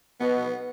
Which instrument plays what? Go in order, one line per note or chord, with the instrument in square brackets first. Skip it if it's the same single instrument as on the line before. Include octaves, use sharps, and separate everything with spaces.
[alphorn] B2 [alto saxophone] B3